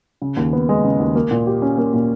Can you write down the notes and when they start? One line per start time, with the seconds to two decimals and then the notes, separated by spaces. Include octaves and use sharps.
0.22 C#3
0.37 D#2
0.53 B3
0.69 G#3
0.84 C#3
1.00 D#2
1.15 A#3
1.31 A#2
1.47 G4
1.62 C#4
1.78 A#3
1.93 A#2